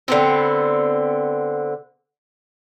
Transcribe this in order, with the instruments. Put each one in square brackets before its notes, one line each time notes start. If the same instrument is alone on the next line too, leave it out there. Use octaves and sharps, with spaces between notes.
[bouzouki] D3 B3 C4